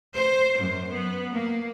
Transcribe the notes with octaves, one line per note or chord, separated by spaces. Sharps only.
C5
F#2
B3
A#3